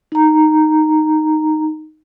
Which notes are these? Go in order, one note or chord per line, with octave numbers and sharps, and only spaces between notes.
D#4 A#5